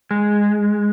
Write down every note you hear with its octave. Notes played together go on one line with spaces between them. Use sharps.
G#3